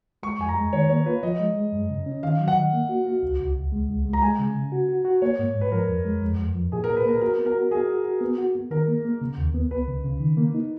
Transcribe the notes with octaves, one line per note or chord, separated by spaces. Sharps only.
G#3 C#6
F2 G#5
A#5
G#3
D#3 C#5
A#3 C#5
F4 B4
F3 D#5
G#3
G#3
F#2
C#3
C#4
D#3 F5
F#3
F#5
D#3
A#3
F#4
F#4
C#2
C#2
C#2
G#3
C#2
G#3
A#5
G#3 G#5
C#3
C#3
F#4
F#4
F#4
A#3 C#5
G#2
G#2
B4
F3 A#4
F2
G#3
F2
F2
F3
A#2 G#4
A#4
A#2
B4
A#3 A#4
F#4 A#4
B3
A#4
F#4
F#4 G#4
F#4
F#4
B3
F#4
B3
D#3 A#4
A#3
A#3
C#3
D#2
B3
C#2 B4
C#3
C#3
D#3
A#3
D#4